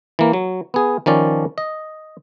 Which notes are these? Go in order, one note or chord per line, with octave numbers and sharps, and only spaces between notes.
E3 A#3
F#3
B3 G#4
D#3 F3 C#4 D5
D#5